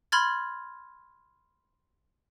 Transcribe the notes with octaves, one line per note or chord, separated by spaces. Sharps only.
B5 C6 F6 G#6 A6